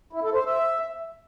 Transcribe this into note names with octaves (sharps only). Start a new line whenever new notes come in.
E4
A4
C5
E5